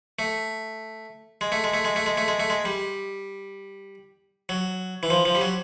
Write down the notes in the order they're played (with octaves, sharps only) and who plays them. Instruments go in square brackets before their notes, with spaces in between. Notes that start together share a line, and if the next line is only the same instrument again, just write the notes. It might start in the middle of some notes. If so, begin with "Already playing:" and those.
[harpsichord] A3
G#3
A3
G#3
A3
G#3
A3
G#3
A3
G#3
A3
G#3
G3
F#3
E3
F3
F3
G3
F#3